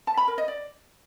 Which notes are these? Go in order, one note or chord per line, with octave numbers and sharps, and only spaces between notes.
A5
B5
A#4
D#5
D5